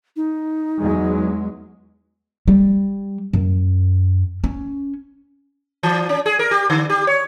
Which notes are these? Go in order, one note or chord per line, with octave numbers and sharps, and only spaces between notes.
D#4
E2 F#3 G#3
G3
F#2
C#4
E3
C#4
G#4
A#4
G4
D3
G4
C#5